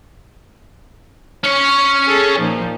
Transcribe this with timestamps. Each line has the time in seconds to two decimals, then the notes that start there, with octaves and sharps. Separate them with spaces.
1.44 C#4 C#5
2.07 G#4 A4
2.39 A#2 F3 D#4